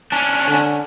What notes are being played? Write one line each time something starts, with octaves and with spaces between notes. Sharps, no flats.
C#4 D4
D3